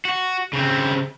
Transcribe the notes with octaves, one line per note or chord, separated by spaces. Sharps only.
F#4
C#3 C4